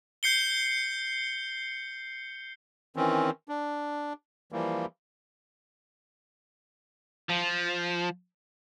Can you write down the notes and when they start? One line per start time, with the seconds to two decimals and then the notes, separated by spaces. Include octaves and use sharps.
0.23 G6 C7 C#7 G7
2.96 D#3 E3 C4 C#4
3.49 D4
4.52 E3 F3 G3 A#3
7.29 F3